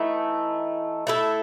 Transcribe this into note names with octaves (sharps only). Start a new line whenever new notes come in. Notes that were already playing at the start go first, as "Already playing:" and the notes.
Already playing: E3 A3 D#4
A3 E4 A4